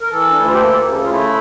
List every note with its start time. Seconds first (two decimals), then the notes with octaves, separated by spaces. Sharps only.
0.01 A#4
0.09 E3 A4
0.30 D4
0.34 D2 E4
0.45 F4
0.52 G4
0.59 A#3 A4
0.84 C#3
1.03 F4
1.09 A3 E4